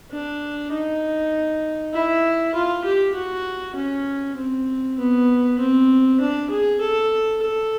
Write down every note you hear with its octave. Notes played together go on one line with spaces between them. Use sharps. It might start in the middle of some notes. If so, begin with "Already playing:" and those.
D4
D#4
E4
F4
G4
F#4
C#4
C4
B3
C4
D4
G#4
A4
A4